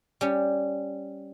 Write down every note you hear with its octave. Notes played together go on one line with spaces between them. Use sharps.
G3 C#4